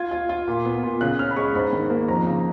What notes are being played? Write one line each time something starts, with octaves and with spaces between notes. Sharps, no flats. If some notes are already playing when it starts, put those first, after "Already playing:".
Already playing: F4 G#6
F4
F4
A#2
B3
A#2
C#3 F#6
C#4 F6
B5
G#3 C#6
G#2 B5
D#3
A#3
F2 A#5
C#3